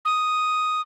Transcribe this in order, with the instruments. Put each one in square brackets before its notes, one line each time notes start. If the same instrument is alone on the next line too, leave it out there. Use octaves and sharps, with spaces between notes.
[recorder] D#6